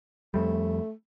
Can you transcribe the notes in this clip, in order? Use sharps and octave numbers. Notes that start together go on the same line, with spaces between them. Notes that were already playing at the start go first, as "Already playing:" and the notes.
F2 G3 A3